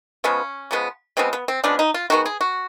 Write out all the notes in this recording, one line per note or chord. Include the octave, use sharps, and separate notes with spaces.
C#3 F3 G#3 B3 C#4
C#3 F3 G#3 B3
C#3 F3 G#3 B3 C4
B3
C4
C#3 F3 G#3 B3 D4
D#4
F4
D#3 G#3 B3 F#4
G#4
F#4